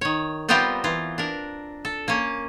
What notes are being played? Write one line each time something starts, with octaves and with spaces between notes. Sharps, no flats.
D#3 C#5
G3 B3 C4 F4 G4 A#4
E3 F4
D4 A#4
A4
A#3 C#4